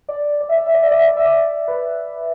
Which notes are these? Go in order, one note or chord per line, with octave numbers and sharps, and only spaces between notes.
D5
D5
E5
D5
E5
D5
E5
D5
E5
D5
E5
D5
B4